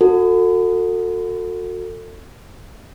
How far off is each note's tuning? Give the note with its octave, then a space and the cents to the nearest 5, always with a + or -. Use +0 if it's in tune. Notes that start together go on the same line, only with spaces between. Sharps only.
F#4 -25 A4 +30